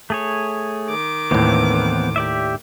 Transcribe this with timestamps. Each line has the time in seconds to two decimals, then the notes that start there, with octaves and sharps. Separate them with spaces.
0.10 A3 G#4 C#5
0.89 D#3 D6
1.31 D#2 A2 E3 B3 C4
2.16 G4 D5 E5